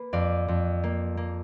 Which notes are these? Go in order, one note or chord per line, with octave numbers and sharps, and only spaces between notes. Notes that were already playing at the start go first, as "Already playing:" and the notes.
Already playing: A#3 B4
F2 D5 F5
F2
A#3
A#3